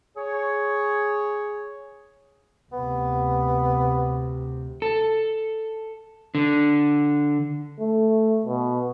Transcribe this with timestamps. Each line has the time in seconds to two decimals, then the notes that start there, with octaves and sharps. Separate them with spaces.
0.17 G#4 C#5
2.72 D2 C3 B3
4.82 A4
6.35 D3
7.79 A3
8.46 B2